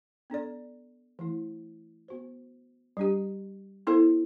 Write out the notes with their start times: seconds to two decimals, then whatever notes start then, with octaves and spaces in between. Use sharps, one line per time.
0.30 B3 D4 A4 D5
1.19 E3 A3 E4
2.08 B3 F#4 C5
2.97 G3 D4 G4
3.87 B3 E4 A4 C5